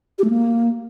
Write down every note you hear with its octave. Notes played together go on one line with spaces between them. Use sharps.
G4
A3
A#3